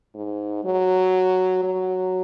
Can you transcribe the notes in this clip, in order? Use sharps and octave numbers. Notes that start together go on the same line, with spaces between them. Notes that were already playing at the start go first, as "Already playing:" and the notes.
G#2
F#3
F#3